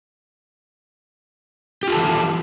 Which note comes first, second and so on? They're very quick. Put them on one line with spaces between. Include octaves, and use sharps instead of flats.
G4 F4 A4 E3